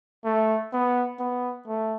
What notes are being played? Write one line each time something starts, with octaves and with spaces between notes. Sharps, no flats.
A3
B3
B3
A3